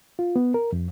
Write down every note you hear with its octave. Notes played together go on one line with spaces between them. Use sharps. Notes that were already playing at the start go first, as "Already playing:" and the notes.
F4
B3
A#4
F2